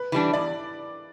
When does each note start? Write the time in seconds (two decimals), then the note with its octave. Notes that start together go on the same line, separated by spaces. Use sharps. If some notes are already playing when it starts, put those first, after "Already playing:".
Already playing: B4
0.12 E3 G3 D4
0.33 E2 D5